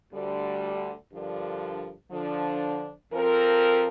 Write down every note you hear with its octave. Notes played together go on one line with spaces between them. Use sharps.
D2 D3 G3
G2 D3 F3 D4 A#4
D3 F3 D4
F2 F3 C4 A#4